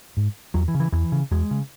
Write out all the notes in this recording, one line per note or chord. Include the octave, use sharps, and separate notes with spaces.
G#2
E2 F#3
E3
C#3
E3
E2 E3
C#3
E2 G#3
C#3